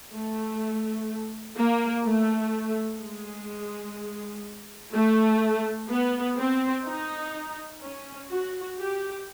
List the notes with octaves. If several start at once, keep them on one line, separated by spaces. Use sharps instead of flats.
A3
A#3
A3
G#3
A3
B3
C4
D#4
C#4
F#4
G4